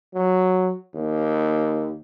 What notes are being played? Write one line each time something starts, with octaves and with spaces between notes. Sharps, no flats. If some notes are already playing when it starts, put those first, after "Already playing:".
F#3
D#2